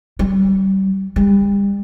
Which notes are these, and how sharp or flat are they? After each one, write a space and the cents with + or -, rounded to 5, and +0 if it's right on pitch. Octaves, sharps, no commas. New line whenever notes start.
G3 -30
G3 +35